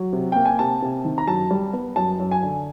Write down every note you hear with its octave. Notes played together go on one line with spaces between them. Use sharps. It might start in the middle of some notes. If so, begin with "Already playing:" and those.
Already playing: F#3
C3
A#3 G5
G#5
C3 A5
C3
D#3
A#5
F#2 A5
G3
B3
F#2 A5
F#2
G#5
D3